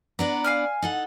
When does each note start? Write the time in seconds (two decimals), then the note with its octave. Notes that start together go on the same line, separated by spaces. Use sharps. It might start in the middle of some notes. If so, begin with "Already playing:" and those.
0.19 B3 D4 B4 A#5
0.44 F5 G#5 F6
0.82 D#4 A4 F#5